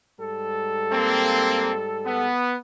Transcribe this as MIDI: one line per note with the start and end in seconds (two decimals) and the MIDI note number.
0.19 2.28 44
0.19 2.28 55
0.19 2.28 69
0.91 1.72 58
0.91 1.72 60
2.06 2.56 59